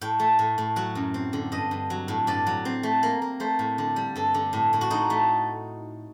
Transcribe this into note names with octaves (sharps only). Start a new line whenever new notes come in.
A2 G5
A3
A2
A2
F#3 F#5
F#2
C4
D3
G2 D#5
G2
F#3
A2
G2 D5
F#3
C4
A3
A#3
A#3
A3 C5
A2
D3
G3
G2 A4
D3
A2
A2
F#4
A2 D#4
A3